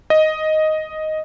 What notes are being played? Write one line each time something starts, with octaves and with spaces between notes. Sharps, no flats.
D#5